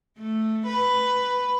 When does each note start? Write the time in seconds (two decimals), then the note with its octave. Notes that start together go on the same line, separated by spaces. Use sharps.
0.19 A3
0.67 B4